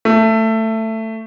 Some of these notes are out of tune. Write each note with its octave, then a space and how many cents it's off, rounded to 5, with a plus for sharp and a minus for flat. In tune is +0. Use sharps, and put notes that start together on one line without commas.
A3 +15